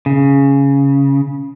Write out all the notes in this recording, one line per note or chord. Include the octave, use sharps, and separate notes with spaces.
C#3